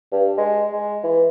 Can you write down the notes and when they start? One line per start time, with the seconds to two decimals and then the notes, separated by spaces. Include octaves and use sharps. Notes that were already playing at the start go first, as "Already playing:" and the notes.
0.12 G2
0.37 G#3
0.73 G#3
1.04 E3